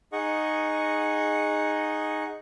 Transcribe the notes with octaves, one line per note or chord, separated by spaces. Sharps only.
D#4 G#4 D#5 F#5 C#6